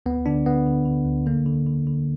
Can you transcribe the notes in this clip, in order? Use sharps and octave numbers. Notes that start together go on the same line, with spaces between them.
D2 B3
D3 D4
D3 B3
D3
D3
D2
D3 A#3
D3
D3
D3